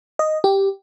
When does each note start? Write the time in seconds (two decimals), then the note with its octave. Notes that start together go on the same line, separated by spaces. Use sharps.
0.19 D#5
0.44 G4